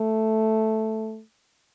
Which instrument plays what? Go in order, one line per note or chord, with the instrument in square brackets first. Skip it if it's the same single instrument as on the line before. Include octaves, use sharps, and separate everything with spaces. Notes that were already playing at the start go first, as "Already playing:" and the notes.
Already playing: [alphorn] A3